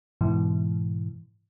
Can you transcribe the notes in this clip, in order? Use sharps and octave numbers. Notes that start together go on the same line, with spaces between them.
G#2 B2 E3